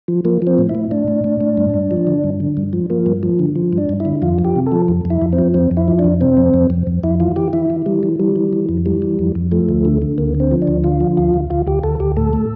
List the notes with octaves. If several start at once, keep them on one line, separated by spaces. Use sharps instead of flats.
F3
F3 A#3
F3 C4
A2
E4
A2
A2 D4
A2
A2
A2
G2
G2
F3
D3
G2
D3
G2
F3
F3 A#3
G2
F3
D3
F3
G2
D4
G2
D3 E4
F2 F4
F3
G4
C3
A4
F3
F2
F2
E4
F2
C4
F3
F2 C4
F2
E4
F3
D4
F2
C3 C4
F2
F2
F2
F2
F2 E4
E3 F4
E3 G4
E3 E4
E3
E3 G3
E3
E3 G3
E3
E3
F2
E3 G3
E3
F2
F2
F3 A3
D2
D3
D3
D2 A#3
D3
C4
F3
D4
D2
D3 F4
F3
D2 F4
D2
D2 F4
D2 G4
D2 A4
D2 G4
A2 A4
A2